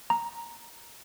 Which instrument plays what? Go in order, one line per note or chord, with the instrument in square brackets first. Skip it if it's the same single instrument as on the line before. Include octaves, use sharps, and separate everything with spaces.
[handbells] A#5